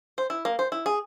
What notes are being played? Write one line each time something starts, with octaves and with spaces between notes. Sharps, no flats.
C5
E4
A#3
C5
E4
G#4